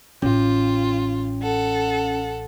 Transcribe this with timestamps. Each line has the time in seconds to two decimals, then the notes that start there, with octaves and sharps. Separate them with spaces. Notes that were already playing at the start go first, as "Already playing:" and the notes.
0.22 A1 C#4 F4
1.42 A4 F#5